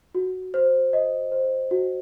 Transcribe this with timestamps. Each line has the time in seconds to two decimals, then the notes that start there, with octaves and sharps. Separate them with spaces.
0.15 F#4
0.54 C5
0.93 D#5
1.32 C5
1.71 F#4